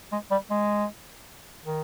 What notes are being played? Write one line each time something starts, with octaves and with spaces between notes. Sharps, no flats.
G#3
G3
G#3
D#3